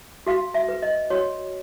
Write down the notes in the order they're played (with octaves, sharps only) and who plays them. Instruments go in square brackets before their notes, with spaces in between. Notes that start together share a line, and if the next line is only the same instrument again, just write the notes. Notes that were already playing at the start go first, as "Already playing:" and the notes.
[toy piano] F#4 F5
E5
B4
D#5
F#4 C#5